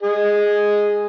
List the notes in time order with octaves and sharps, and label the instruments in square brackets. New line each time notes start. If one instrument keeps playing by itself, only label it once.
[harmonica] G#4 D#5